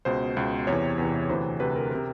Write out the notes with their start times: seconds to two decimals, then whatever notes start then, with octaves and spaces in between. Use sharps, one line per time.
0.05 C#2 B2 C5
0.37 C#2 B2
0.67 E2 C3 E3 C#5
0.98 E2 C3 E3
1.29 D2 C3 E3 C5
1.60 D2 C3 E3 B4
1.76 A#4
1.91 C3 A#4